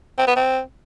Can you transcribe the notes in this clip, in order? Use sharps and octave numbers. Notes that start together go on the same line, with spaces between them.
C4
B3
C4